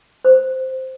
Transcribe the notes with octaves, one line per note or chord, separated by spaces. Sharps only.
C5